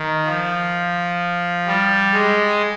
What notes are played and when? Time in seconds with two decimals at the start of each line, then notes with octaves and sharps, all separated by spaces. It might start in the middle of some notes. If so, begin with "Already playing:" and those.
Already playing: D#3
0.26 F3
1.67 G3
2.13 G#3